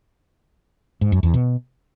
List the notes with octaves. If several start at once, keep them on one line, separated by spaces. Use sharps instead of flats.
G#2
F#2
E2
B2